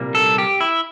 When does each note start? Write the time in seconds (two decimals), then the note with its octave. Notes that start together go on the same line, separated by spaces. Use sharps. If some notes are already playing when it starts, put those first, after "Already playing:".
Already playing: C2 A#2 G3 A#3
0.15 A4
0.38 G4
0.60 E4